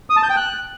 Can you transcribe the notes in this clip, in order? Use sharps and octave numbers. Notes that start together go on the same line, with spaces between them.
D#6
A5
G6
G5
F#6